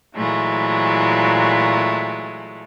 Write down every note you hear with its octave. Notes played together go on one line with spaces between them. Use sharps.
A#2 E3 F#3 G#3 A3